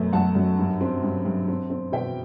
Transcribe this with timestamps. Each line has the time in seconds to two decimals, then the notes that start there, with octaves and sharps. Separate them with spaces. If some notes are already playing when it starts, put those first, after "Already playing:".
Already playing: F#2 B2 A3
0.13 F#2 F#5 A5
0.35 F#2
0.58 G2
0.81 C4
1.03 G2
1.25 G2
1.48 C4
1.70 C4
1.92 B2 E5 G5